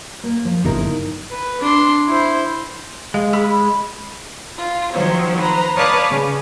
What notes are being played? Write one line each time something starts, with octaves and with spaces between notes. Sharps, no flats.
A#3
F3
G1 C#3 D#4 E4 A#4
B4
D4 C6
E4 C5
G#3 F5
G#4 B5
F4
D#3 F3 F#3 C5 C#5
B4 C5 A#5
B4 C#5 D5 F5 A5 D#6
C#3